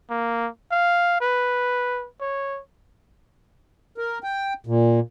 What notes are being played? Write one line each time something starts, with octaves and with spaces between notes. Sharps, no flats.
A#3
F5
B4
C#5
A#4
G5
A#2